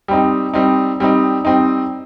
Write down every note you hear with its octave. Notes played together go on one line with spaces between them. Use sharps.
G3 C4 D#4
G3 C4 D#4
G3 C4 D#4
G3 C4 D#4